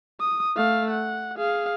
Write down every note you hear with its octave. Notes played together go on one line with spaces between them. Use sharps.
D#6
A3 F5
F#5
G#4 F5